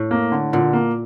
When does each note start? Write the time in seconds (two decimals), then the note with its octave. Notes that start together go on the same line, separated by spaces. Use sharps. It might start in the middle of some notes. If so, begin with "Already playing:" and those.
Already playing: A2
0.11 A#3
0.32 D3
0.53 A#2 D3
0.73 A#3